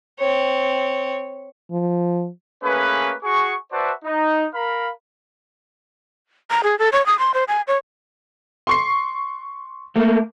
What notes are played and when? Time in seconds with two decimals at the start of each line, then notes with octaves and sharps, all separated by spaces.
0.19 C4 C#5
1.72 F3
2.63 A3 A#3 C#4 G#4 B4
3.23 F#4 G#4 C#6
3.72 F#4 B4 C5 D5 E5 A5
4.04 D#4
4.54 A#4 F5 B5
6.51 A#5
6.63 G#4
6.79 A4
6.92 C#5
7.06 D#6
7.19 C6
7.34 C5
7.48 G#5
7.67 C#5
8.67 C6 C#6 C7
9.96 A3 A#3